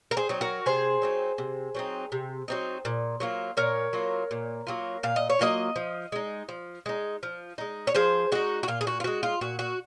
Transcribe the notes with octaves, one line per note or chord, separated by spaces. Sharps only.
A#4
G#4 C5
F#3 C4 D#4
F#4 A#4
C3 G#4 C5
F#3 C4 D#4
C3
F#3 C4 D#4
C3
F#3 C4 D#4
A#2
F#3 A#3 F4
A#2 A#4 C#5
F#3 A#3 F4
A#2
F#3 A#3 F4
A#2 F5
D#5
C#5
F#3 A#3 F4 C5 D#5
F3
G#3 D#4
F3
G#3 D#4
F3
G#3 D#4
C#5
F3 G#4 C5
G#3 D#4 F#4
F#4
A#2 F4
G#4
F#4
F4
F3 G#3 F#4
F4
A#2 F#4
F#4